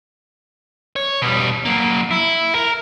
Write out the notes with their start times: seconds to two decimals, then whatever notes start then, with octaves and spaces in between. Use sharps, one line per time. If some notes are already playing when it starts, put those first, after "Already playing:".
0.96 C#5
1.22 B2 G3
1.65 F#3 A#3
2.11 E4
2.55 A#4